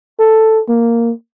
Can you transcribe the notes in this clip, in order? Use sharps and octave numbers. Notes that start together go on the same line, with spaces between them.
A4
A#3